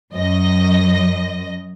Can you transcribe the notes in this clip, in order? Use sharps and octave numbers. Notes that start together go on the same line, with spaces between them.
F#2 D#5